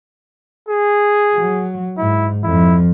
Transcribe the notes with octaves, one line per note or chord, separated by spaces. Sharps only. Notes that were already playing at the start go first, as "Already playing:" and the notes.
G#4
F#3
G#2 E4
F2 E4